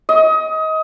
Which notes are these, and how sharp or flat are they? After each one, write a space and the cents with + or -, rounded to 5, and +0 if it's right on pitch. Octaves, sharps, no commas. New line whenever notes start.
D#5 +25